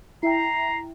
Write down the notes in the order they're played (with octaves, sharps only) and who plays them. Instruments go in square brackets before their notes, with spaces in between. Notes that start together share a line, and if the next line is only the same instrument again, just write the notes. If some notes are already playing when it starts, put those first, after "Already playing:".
[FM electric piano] E4 E5 G5 [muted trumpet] A#5 [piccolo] C7